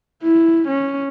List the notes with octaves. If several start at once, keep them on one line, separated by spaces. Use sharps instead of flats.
E4
C#4